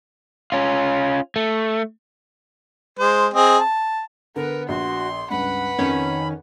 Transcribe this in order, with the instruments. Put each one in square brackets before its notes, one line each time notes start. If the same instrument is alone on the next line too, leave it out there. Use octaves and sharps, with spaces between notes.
[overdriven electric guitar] C#4 F4
A3
[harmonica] G#3 C5
C4 G#4 D#5
A5
[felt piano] D3 [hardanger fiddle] B3 B4 [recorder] A#4
[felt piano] A#1 [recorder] F#4 [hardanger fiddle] C6
[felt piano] C#2 G2 [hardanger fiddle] B4 F#5 [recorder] B5
[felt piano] F2 [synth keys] D#3 C#4